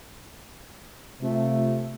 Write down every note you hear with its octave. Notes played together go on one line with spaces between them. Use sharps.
C3 A3 F4